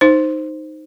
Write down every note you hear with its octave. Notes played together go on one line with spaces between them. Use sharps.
D#4 C5